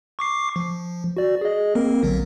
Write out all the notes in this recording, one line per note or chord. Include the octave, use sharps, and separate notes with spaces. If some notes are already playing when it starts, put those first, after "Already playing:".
C#6 D6 C7
F3
F#4 D5
G#4 D#5
A#3 C4 A#4
A#1 D3 F#3